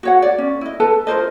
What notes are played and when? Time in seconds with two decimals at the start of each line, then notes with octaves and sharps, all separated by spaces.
0.03 F#4 C#5 F#5
0.22 D5
0.38 C#4
0.61 E4 D#5
0.80 A4 B4 A5
1.07 F4 A#4 C5 D#5